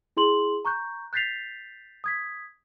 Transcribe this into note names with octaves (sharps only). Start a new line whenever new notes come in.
E4 G#4 C6 F#7
A#5 C#6 F#6 G6
F#6 G6 A6 B6 C7 F7
D#6 G#6 B6